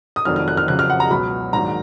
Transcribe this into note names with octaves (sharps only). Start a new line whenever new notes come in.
D#6
F1 F2 D#3 F#3 F6
F6
F#6
F6
F2 C#3 F#3 F#6
F6
F#5
A#5
C#2 B2 F#3 B5
A#1 G#2 D#3 F#3 A#5